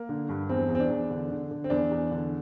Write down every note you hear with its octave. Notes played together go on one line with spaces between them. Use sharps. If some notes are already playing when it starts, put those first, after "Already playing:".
Already playing: A#3
D3
G2
E2 C4
E2
C4
D4
E2
D3
D3
D3
C4
E2 D4
E2
D3